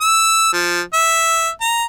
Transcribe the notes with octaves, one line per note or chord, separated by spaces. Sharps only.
E6
F3
E5
A#5